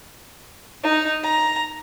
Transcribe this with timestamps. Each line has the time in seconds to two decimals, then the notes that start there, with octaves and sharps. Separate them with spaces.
0.84 D#4
1.23 A#5